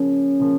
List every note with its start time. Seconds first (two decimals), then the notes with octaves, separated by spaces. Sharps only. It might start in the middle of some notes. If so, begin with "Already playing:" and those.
Already playing: C#3 F3 A#3 C#4
0.40 C#3 F3 A#3